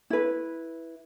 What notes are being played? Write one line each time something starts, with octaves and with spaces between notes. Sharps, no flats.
E4 B4